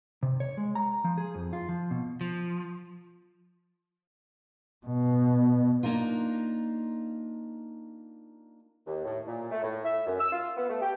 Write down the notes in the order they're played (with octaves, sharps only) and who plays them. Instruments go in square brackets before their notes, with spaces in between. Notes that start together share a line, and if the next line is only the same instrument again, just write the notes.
[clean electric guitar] C3
C#5
G#3
A#5
F3
G#4
F2
F4
F3
B2
[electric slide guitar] F3
[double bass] B2
[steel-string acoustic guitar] A#3 D4 D#4 F4
[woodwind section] D#2
A2
A#2
A3
A2
E5
F#2
E6
F4
B3
A3
G4